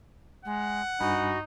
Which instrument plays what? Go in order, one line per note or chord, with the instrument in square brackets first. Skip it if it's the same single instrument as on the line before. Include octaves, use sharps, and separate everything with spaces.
[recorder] G#3 [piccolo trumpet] F#5
[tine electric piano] G2 G#5 B5 [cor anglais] D#4 [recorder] F#4